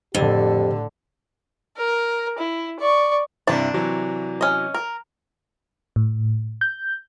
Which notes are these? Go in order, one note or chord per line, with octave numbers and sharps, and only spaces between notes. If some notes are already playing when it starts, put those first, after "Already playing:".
F2 A2 D3 G4
A#4
E4
D5 C#6
G2 C3 D4 E4 A5
C3 E3 F#3
C#4 D#5
A#4
A2
G6